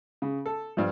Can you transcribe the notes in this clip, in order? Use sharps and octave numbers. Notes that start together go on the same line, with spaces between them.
C#3
A4
G2 F3